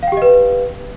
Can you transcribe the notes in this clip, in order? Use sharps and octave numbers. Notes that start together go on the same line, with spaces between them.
G4 B4 D#5 F5 G5